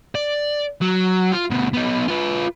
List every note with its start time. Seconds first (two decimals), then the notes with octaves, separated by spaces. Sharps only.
0.15 D5
0.81 F#3
1.32 F4
1.51 D2 B2
1.73 B3 D#4
2.08 F4 B4